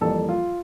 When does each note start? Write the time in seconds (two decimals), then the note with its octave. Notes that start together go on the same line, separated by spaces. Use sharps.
0.01 F2 E3 G3 A#3 A4
0.29 F4